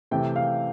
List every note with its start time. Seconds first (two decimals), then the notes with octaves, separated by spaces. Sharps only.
0.11 C3 E3 A3 G5
0.36 F5